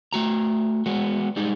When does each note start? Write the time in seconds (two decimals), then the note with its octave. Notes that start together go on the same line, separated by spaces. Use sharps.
0.13 A3 F#4 A#5
0.86 G#3 B3 F#4
1.36 G3 G#3 D#4